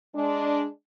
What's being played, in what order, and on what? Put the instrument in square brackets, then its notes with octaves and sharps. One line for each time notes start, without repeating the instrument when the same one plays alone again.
[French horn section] G#3 D4